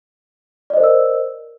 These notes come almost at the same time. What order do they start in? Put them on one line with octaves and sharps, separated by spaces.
D5 D#5 C5 A#4 E6